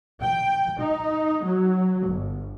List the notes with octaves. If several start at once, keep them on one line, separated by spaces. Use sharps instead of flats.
G5
D#4
F#3
G1